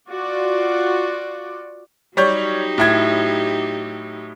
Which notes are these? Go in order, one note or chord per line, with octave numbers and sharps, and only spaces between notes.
F4 F#4 D5
F#3 G3 D#4 G4 C#5 G6
A2 E4 G#6